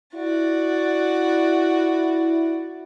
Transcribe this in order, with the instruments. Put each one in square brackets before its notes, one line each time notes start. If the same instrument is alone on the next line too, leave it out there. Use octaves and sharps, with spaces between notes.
[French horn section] E4 [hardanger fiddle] F#4 D5